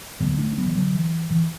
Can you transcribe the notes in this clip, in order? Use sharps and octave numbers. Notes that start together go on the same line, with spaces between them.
D2 D3 F#3 B3
A3 D4
D4
F#3 B3
E3
D3 F#3
E3
E3